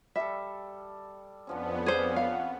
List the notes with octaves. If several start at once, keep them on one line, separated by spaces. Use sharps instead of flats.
G3 A4 E5
F2 D3 F3 B3 C#4
C#3 C#4 D4 G#4 C5
C#5 F5 F#5